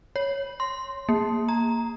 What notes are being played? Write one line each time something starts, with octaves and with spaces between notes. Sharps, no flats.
C#5
C6
A#3
A#5